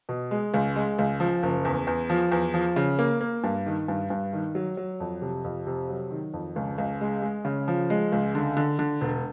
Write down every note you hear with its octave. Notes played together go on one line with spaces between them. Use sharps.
B2
G#3
C#2
G#3
C#2
F3
F#1
E2
E2
F3
E2
F3
C#3
A#3
A#3
G2
D#3
G2
G2
D#3
F#3
F#3
F2
C3
F2
C3
F#3
D#3
F2
C#2
C#2
G#3
G#3
C#3
F3
G#3
C#2
D3
D3
D3
E1